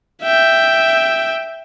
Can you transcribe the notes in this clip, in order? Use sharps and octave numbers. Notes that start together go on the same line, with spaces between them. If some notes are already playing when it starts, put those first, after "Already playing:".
E5 G5